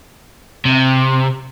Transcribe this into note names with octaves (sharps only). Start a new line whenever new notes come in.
C3